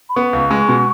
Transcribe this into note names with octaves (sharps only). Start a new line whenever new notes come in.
B5
B3 C#6
C#2
G#3
B2